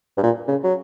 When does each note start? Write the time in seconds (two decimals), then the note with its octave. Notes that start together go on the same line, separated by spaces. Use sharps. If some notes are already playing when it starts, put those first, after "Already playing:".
0.17 G2
0.23 A#2
0.48 C#3
0.63 F#3